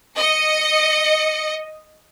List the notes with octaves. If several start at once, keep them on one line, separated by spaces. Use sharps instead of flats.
D#5 C#7